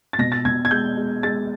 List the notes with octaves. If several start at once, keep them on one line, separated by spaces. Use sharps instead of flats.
A6
B2 A#6
A6
B2 G#6
G#6
G#3 G6
G#3
G#3 A6